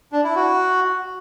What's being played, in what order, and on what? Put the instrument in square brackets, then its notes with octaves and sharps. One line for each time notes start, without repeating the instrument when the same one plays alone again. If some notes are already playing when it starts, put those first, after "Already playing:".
[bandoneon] D4
E4
F#4